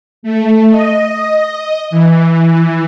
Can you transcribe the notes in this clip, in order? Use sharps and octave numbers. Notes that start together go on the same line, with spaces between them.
A3
D#5
E3